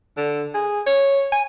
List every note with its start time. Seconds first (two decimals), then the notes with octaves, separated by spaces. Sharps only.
0.17 D3
0.54 G#4
0.87 C#5
1.32 G#5